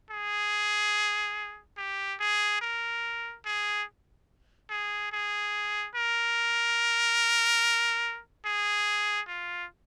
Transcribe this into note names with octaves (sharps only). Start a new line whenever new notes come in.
G#4
G4
G#4
A#4
G#4
G#4
G#4
A#4
G#4
F4